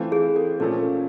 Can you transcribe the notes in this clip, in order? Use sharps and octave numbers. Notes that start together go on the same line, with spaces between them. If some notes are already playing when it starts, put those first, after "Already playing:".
Already playing: E3 A3 C4 F4
G#4
A4
A#2 F3 A3 C#4 A4